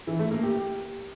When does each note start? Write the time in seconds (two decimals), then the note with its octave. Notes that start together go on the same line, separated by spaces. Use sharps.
0.07 E3
0.19 A3
0.31 A#3
0.43 G4